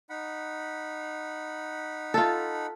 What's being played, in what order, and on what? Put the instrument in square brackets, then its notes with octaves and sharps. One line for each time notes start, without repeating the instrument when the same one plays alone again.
[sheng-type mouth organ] D#4 F#5 B5
[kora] F4 A4